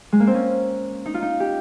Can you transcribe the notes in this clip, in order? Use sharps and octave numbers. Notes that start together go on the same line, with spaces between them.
G#3
A#3
C4
C#4
D#4
F4
D#4
G4